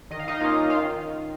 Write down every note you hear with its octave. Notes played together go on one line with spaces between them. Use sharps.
D#3 D#5
F5
D#4 D#5
A#3 C#4 F4 F5
D#3 F4 F5